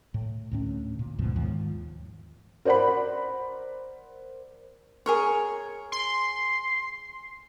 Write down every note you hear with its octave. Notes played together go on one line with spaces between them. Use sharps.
A2
D2 A2 C#4
A#2
D2 G#2 B2 F3
D#2 G#2 F3
A#4 C5 D5 F#5 B5
G#4 A#4 C#5
C6